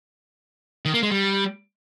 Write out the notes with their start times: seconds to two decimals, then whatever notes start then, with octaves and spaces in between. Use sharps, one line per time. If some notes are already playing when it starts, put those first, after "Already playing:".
0.85 D#3
0.94 A#3
1.03 G#3
1.11 G3